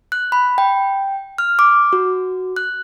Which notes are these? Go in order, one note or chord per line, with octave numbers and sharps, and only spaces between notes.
F#6
B5
G5
F6
D6
F#4
F#6